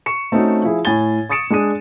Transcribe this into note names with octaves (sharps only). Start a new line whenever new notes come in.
C#6 C#7 E7
A3 C4 C#4 D#4 F#4
F3 E4 G#4
A2 G#5 G#6 A6 G7
C#6 D#6 A6 C#7 D7 E7
G#3 D4 G#4 D#6 D#7